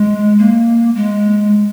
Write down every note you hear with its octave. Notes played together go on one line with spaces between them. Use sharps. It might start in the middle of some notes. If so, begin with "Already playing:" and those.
Already playing: G#3
A#3
G#3